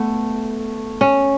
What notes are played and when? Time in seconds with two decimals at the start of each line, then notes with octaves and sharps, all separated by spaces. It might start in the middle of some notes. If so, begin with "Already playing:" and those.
Already playing: A3 B3
1.01 C#4